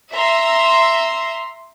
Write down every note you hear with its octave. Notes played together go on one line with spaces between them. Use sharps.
E5 A#5 C6 E6